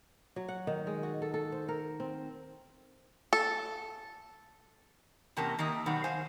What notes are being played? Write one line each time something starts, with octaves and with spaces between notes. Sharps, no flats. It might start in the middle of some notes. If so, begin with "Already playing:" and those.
F#3
F#5
D#3
G#3
F#4
A4
A4
C5
A#4
C4
A4
E2 C3 A#3 C#4 A#4 A5
D#3 A#3 G4 D#5 E5
B2 D#3 F#3 G3 F#4
C5 F5 G#5